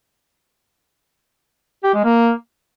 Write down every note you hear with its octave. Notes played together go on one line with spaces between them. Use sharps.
G4
G#3
A#3